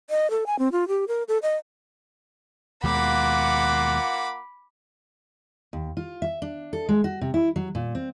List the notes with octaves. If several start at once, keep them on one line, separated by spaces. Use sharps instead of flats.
D#5
A4
G#5
C4
F4
G4
A#4
A4
D#5
D#2 B2 G#3 A#3 F4 F#5 B5 D6
D#2
F4
E5
D4
A4
G#3
F#4
C3
E4
F#3
A#2
C4